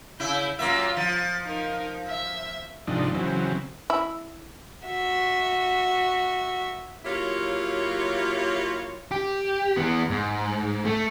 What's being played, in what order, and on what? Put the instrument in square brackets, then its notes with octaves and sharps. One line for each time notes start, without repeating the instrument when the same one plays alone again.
[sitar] C#3 E4 [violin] G6
[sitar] F#2 A#3 E5 [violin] F4 B6
[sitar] F3 [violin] A6
[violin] D#4 A#4
E5
[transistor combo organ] G#2 C3 F3 D4 D#4
C#3 E3 F#3 C4
[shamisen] E4
[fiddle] F#4 E5
[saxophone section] F#3 A#3 E4 F4 G4 C#5
[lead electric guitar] G4
E3 B3
G#2
A3